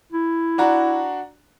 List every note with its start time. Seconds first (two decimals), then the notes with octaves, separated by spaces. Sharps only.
0.12 E4
0.58 D4 F#4 A#5